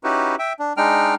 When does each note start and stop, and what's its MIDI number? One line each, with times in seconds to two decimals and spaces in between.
0.04 0.35 61
0.04 0.35 63
0.04 0.35 64
0.04 0.35 66
0.04 0.35 67
0.04 0.35 71
0.39 0.53 76
0.39 0.53 79
0.59 0.73 62
0.77 1.15 56
0.77 1.15 62
0.77 1.15 63
0.77 1.15 79
0.77 1.15 89